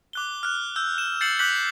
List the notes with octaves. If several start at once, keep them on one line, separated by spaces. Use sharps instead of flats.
D6 F#6 G7
F6 F#6
E6 G6
E7
G6 A6 C7 C#7 E7 F#7
D6 F#6 G6 B6 F#7